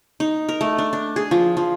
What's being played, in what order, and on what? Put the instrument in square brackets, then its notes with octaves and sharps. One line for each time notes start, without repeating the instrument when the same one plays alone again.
[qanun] D#4
A#4
A3
D4
D4
G#4
F3
F3